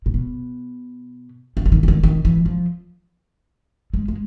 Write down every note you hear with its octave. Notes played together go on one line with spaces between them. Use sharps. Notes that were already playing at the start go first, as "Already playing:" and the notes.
A#2
B2
D#3
D3
D#3
E3
D#3
D#3
E3
F3
G#3
G#3